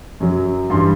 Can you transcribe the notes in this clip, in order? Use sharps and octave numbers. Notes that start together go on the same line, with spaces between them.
F#2 F#3
G2 E3 G3 C6